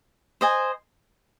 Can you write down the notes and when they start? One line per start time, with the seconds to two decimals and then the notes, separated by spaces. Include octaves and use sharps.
0.41 C5 D#5 G#5